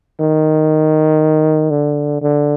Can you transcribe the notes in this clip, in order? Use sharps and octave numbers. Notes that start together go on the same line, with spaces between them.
D#3
D3
D3